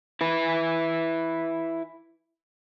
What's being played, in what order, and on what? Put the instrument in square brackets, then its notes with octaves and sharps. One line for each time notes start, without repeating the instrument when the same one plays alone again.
[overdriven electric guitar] E4 B4